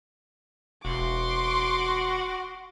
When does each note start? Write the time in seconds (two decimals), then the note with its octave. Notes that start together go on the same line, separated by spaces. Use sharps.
0.85 E1 F#4 C6 D6